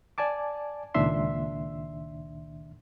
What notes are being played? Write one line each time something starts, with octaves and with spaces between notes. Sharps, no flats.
D5 G#5 A5 D6
C#2 A#2 D#3 D4 E5 C6